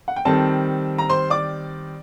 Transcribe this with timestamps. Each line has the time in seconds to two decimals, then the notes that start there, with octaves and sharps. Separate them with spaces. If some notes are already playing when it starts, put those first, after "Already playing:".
0.08 F#5
0.16 G5
0.25 D#3 G3 C4 A4 A5
0.98 A#5
1.09 C5 C6
1.30 D5 D6